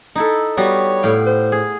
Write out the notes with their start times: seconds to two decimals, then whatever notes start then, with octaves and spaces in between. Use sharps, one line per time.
0.15 D#4 E4 A4
0.57 G3 B3 F#4 C#5
1.03 A2 F5 G5
1.26 C5
1.52 G#4